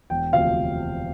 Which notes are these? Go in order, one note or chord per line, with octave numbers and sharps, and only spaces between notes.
E1 G5
D2 C3 F3 F5